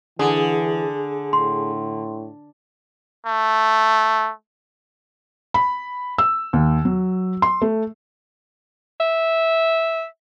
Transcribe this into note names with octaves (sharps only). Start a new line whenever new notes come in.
D3 E3 G#4
A2 C6
A3
B5
E6
D#2
F#3
C6
A3
E5